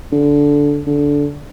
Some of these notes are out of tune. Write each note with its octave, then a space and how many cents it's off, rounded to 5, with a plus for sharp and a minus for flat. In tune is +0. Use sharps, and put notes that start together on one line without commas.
D3 -15
D3 -15